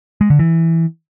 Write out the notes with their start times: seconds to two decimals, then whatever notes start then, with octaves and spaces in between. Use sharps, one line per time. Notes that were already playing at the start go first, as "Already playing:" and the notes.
0.21 G#3
0.30 D3
0.39 E3